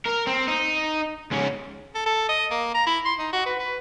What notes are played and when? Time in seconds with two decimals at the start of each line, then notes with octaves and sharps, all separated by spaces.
0.06 A#4
0.27 C4
0.48 D#4
1.31 G#2 C#4
1.95 A4
2.06 A4
2.29 D#5
2.51 A#3
2.74 A#5
2.86 E4
3.05 C6
3.19 D#4
3.33 F#4
3.46 B4
3.59 B4